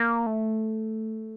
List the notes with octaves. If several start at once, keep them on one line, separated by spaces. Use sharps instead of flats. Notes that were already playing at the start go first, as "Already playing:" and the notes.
Already playing: A#3
A3